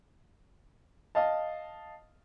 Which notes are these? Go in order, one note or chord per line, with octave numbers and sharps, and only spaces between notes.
D#5 F5 A5